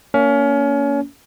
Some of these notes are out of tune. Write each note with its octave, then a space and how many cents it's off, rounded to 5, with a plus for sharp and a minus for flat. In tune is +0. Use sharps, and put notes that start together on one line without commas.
A#3 -10 C#4 +30